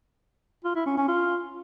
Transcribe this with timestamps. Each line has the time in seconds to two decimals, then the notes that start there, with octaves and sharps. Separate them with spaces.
0.64 F4
0.75 E4
0.86 C#4
0.97 C#4
1.08 F4